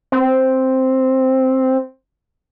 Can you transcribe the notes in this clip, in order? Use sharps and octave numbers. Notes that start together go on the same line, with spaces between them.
C4